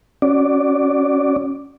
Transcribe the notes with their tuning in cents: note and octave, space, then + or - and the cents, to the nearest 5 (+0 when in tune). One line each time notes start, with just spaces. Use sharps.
C#4 +0 F#4 +5 D5 +0